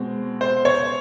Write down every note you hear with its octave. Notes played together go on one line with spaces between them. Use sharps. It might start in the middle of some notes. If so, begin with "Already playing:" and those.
Already playing: B2 G#3 C4
C5
C#5